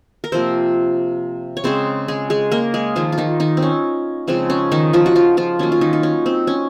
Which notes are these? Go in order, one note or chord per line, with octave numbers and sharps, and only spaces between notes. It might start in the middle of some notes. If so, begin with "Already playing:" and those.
A#4
C3 F3 A#3 C4 C5
C#5
C#3 G#3 C4 C5
G#3 G#4
G#3 G#4
A#3 A#4
G#3 G#4
D#3 F3 A#3 F4
F4
D#3 D#4
D#3 D#4
C4
C#4
C#3 F3 G#3 C4
C#4
D#3 D#4
F3 F4
F#4
F3 F4
F3 F4
D#3 F#3 A#3 C#4
F4
D#3 D#4
D#4
C#4
C4
C#4